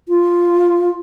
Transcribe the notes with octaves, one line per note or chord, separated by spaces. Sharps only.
F4